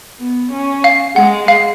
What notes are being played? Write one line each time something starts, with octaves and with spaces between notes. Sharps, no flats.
B3
C#4
F5
G#3 F#5
F5